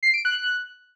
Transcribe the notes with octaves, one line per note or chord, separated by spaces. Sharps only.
C7
D7
F#6